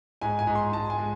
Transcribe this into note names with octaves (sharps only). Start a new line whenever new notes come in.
G#2 G#5
G#5
G#2
C6
G#2 A5
G#5
G#3